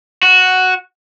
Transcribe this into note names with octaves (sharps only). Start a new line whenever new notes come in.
F#4